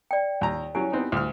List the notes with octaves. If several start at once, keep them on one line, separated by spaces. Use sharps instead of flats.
D5 G5
D#2 A#5
F#3 C#4 E4 G4 G#5
B3 C4 D#4
D2 F6